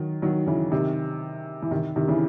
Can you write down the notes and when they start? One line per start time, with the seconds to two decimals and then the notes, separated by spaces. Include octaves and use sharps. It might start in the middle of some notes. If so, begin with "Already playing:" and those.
Already playing: D#3 F#3
0.22 D#3 F#3
0.46 C#3 E3
0.71 C3 D#3
1.62 E3
1.71 C3 D#3
1.96 C3 D#3
2.08 C#3 E3